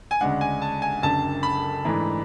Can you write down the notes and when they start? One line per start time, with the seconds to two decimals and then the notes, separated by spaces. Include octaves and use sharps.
0.11 G#5
0.21 D2 C#3 G#3 D4 F#5
0.41 G#5
0.62 A5
0.82 G#5
1.03 F#1 F#2 D3 A5
1.43 B5
1.85 G#2 E3 A3 D4